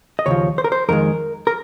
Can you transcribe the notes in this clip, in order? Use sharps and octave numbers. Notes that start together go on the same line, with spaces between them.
D#5
D#2 C#3 F3 C#5
C5
A#4
C5
F2 D#3 G#3 A#4
A#4